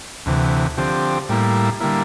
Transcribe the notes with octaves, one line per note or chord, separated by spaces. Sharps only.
D2 C3 E3
D3 F3 C4 G4
A2 G3 A#3 E4
D3 G3 A#3 E4